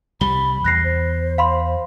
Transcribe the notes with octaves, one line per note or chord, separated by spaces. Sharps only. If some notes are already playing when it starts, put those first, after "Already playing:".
C2 G3 B5 G7
E2 F#6 A#6 C7
C5
F5 B5 C6